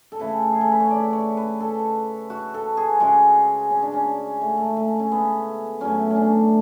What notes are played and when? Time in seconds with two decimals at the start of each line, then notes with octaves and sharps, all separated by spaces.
0.12 A4
0.20 C#3 E3 A3 B4
0.52 G#4
0.61 A4
0.72 B4
0.80 C#5
0.91 D5
1.13 C#5
1.37 B4
1.60 A4
2.30 F#4
2.54 A4
2.77 G#4
3.00 C#3 G#3 F#4
3.71 C#4
3.82 D4
3.94 C#4
4.41 A3
4.57 A3
4.77 A3
5.00 C#4
5.12 B3
5.81 A2 F#3 A3 C#4
6.11 C#4
6.16 D4